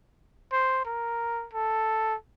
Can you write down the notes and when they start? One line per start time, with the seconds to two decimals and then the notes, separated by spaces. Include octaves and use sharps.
0.52 C5
0.85 A#4
1.53 A4